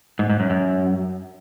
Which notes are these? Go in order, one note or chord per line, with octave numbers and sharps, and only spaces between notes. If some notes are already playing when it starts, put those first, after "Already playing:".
G#2
G#2
F#2
F#2